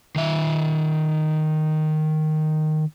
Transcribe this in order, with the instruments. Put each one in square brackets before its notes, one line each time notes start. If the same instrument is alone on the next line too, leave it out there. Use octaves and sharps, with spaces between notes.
[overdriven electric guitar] D#3 E5